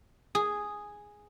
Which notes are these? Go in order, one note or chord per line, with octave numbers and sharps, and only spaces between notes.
G#4